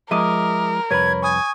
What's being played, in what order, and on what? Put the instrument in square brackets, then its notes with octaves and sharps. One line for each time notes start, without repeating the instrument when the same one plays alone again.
[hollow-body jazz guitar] F3 G#3 D#5 [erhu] A#4 [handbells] E5 D6 D#6
[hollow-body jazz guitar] C2 F2 B4 [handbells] C#5 B5 [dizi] G#6
[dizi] G#5 [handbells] C#6 D#6